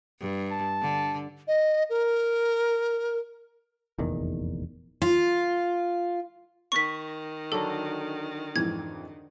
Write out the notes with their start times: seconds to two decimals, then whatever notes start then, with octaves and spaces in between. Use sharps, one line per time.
0.20 G2
0.51 A5
0.81 D3
1.48 D#5
1.90 A#4
3.98 F1 A#1 E2 D#3
5.02 F4
6.72 D#3 C#6 B6
7.52 D3 F#3 D4 A4
8.56 F2 G#2 E3 G#6